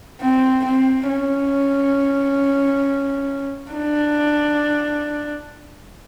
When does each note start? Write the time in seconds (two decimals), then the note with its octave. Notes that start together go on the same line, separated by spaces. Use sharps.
0.21 C4
0.65 C4
1.09 C#4
3.72 D4